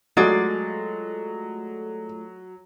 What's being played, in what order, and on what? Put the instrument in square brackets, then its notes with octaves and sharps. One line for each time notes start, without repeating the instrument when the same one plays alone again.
[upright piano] F#3 [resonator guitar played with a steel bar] G#3 D5 [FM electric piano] A3 F4 A4 [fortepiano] F#4